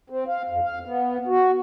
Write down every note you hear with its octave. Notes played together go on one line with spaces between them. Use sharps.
C4
F5
F2
F5
B3
F#4